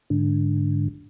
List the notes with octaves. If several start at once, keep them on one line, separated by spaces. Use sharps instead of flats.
G#2 D3